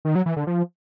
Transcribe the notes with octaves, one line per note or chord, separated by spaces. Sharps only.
D#3
F#3
E3
D3
F3